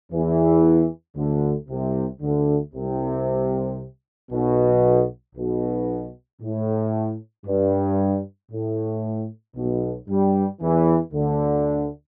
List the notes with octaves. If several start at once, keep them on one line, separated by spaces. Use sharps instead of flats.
E2 E3
D2 D3
C2 C3
D2 D3
C2 C3
B1 B2
B1 B2
A2
G2
A2
B1 B2
G2 G3
E2 E3
D2 D3